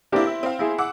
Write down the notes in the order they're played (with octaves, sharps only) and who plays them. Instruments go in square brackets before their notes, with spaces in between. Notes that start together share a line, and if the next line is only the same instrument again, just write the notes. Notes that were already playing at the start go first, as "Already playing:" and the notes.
[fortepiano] A#3 D4 G4 [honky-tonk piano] C4 E4
[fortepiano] E5
[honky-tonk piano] C4 F5
[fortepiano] E4 G#4
[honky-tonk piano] F#5 D6 E6